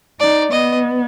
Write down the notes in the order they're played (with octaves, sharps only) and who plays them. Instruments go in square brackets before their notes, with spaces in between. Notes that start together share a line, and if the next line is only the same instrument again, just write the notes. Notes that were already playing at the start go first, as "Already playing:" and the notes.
[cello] D#4 [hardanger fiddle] D5
[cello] B3 [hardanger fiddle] D#5